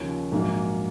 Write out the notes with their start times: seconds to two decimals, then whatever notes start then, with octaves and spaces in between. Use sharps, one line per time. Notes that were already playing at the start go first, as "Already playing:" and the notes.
Already playing: D#2 C#3 F3 C#5
0.32 A#1 G#2 F#3 A#3